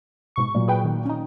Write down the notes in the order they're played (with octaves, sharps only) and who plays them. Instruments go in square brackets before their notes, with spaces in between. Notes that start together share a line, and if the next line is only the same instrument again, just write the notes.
[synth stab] G#2 B2 C#6
[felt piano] A#2 F#3
[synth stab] G#4 B4 G5
D#3
C#4 D#4